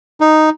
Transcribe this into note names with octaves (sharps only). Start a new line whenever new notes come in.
D#4